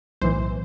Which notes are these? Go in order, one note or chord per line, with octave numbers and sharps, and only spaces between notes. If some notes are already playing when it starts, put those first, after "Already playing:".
B1 A2 E3 C5